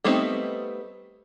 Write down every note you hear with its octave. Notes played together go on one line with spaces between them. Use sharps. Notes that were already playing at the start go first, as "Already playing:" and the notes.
G3 A3 B3 C4 D#4